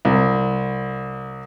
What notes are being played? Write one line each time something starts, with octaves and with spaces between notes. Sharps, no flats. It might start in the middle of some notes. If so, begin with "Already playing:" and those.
C2